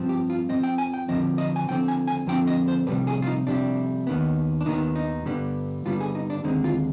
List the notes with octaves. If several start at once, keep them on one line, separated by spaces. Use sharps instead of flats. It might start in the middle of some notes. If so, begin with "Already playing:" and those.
Already playing: G2 F3 C4
G4
F4
F2 D3 F3 C4 D#5
G5
G#5
G5
F2 D3 F3 C4 D#5
D#5
G#5
F2 D3 F3 C4 G5
G#5
G#5
F2 D3 F3 C4 G5
D#5
C5
F2 C3 G3 B4
G#4
F4
D#4
F2 C3 G3 D4
D#2 D#3 B3
D4
D#2 D#3 B3 D#4
D#4
G2 D3 G3 B3
G2 D3 G3 B3 F4
G#4
D#4
D4
D#2 D3 G#3 C4 D#4
F4